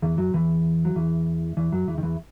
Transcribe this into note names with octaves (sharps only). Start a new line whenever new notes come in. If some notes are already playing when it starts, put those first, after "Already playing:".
E2 E3
F#2 F#3
E2 E3
F#3
E2 E3
E2 E3
F#2 F#3
E2 E3
D#3
E2 E3